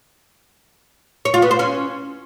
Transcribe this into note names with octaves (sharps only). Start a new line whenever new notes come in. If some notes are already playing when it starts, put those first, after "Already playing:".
C#5
F4
B3
C5
C#4